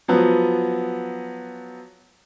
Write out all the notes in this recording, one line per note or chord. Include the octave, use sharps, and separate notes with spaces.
F3 F#3 B3